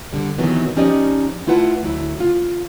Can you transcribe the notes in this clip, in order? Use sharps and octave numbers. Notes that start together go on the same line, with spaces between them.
D3 G3
C3 D#3 E3 F#3 B3
F3 C#4 D#4 G4 D5 D#5
A3 E4 F4 B4 F#5 A5
D2 F#3 E4
F4